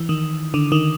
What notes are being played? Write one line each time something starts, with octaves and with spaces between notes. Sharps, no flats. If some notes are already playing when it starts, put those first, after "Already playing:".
Already playing: E3
D#3
D3
D#3